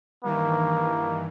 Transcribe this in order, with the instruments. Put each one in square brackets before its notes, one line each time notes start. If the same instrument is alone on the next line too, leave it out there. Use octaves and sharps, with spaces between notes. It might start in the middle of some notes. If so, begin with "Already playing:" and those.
[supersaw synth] G2 D#3 E3 [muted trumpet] A#3